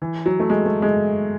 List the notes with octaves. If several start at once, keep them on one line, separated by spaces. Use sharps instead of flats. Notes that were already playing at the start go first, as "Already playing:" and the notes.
E3
F#3
A3
G#3
A3
G#3